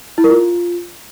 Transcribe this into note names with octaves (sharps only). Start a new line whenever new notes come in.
E4
A#4
F4